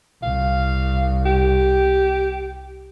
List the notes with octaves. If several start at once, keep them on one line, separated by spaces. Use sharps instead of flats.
C2 F5
G4